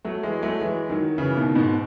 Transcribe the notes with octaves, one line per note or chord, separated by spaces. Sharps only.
F#3 A3
E3 G#3
F#3 A3
E3 G#3
D#3 F#3
C#3 E3
B2 D#3
G#2 B2